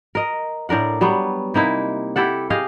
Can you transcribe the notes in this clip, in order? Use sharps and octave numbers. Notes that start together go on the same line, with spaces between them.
A#4 D#5
A2 D4 A#4 F#5
F#3 G3 B3
C3 A#3 D#4 E4
E4 G4 A4 F#5
G4 G#4 D#5 F5